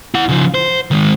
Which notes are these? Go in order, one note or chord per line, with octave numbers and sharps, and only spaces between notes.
E4 F#5
C#3 F3
C5
D#3 G#3